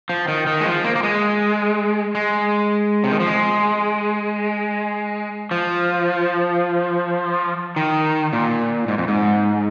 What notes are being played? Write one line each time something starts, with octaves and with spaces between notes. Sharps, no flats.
F3
D#3
D#3
G#3
F3
A#3
A#3
G#3
G#3
C3
D#3
F3
G#3
F3
D#3
A#2
G#2
F2
G#2